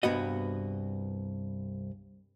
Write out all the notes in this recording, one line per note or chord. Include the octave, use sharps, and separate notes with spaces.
C2 G2 B3 F#4 D#5